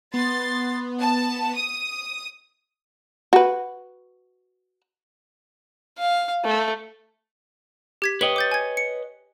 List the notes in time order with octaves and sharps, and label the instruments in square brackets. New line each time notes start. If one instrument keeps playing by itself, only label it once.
[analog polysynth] B3 [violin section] C6 A6
[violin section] A5
D#6
[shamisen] F#4 B4
[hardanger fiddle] F5
A3
[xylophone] G4 G#6 B6
[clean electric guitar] B4 C#5 D#5 [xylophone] G5 F#7
[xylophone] D6 G6 A6
G#5 G#6
C#7